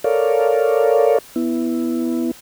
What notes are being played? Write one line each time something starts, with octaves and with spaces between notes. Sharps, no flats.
A4 A#4 C#5 D5 F5
B3 E4